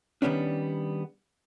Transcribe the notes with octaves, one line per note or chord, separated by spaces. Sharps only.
D#3 G3 A3 B3 C#4 D4